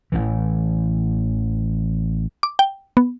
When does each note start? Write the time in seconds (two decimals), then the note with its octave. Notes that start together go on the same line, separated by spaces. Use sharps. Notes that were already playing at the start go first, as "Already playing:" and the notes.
0.12 A1 A2 E3
2.43 D6
2.59 G5
2.97 B3